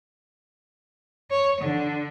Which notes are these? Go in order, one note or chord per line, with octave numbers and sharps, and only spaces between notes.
C#5
D3